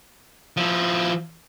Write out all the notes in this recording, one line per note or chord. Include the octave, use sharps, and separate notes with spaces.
F3 E4